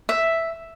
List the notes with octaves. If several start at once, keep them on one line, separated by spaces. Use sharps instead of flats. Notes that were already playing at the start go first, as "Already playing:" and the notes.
E5